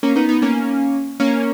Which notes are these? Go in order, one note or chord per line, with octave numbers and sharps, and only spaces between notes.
A#3 C#4
B3 D#4
B3 D#4
A#3 C#4
A#3 C#4